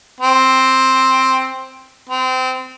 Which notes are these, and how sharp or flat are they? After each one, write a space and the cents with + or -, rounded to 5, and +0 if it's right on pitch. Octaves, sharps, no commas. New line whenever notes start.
C4 +5
C4 -25